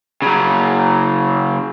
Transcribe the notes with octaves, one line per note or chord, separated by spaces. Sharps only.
C#3 F#3